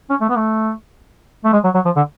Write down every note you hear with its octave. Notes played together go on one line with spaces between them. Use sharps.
C#4
A3
B3
A3
A3
G#3
F#3
F#3
F3
D3